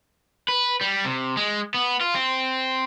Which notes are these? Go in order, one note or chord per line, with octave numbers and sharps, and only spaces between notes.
B4
G3
C3
G#3
B3
F4
C4